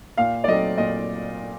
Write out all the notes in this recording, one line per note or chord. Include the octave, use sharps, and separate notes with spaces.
A#2 F5
D5
F#3 A3 C4 D#5
A#2 D#5